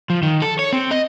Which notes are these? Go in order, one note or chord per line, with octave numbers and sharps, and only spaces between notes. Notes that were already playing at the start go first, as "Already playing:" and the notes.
F3
D#3
A4
C#5
C4
D#5